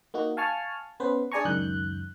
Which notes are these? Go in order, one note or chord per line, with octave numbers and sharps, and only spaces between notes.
A#3 D#4 F#4
F5 G#5 A5 C#6 F6
B3 C#4 B4 C5
D4 G#4 D5 G#5 A#5 C#6
C#2 F#2 D#3 F#6 G6